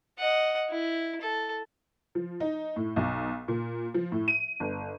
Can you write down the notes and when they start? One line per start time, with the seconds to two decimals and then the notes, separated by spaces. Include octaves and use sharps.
0.18 D#5 F#5
0.70 E4
1.21 A4
2.15 F3
2.40 D#4
2.76 A2
2.96 B1
3.48 A#2
3.94 F3
4.12 A2
4.28 D#7
4.60 G1